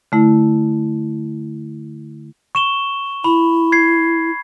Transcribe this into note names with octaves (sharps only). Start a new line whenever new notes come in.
D3 A3 E4
C#6 E7 G7
E4 B5
G#6 C7